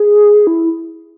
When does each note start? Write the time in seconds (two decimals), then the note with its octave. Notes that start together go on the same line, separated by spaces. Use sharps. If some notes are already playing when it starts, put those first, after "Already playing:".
Already playing: G#4
0.47 E4